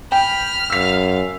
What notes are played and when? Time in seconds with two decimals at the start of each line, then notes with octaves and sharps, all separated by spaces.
0.12 G5 B5 F6
0.70 F#2 F5 E6 B6